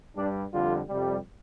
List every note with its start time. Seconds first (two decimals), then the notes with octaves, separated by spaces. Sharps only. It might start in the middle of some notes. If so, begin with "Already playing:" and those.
0.15 G2 G3 D4
0.51 F2 D3 G3 F4
0.88 F2 C3 G3